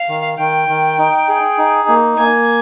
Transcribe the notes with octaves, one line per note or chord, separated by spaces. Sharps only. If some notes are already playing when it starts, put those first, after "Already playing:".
Already playing: F5
D#3
D#3 G5
D#3
D#4
G#4
D#4
A#3
A#3 G#5